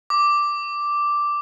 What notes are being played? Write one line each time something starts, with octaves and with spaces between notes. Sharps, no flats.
D6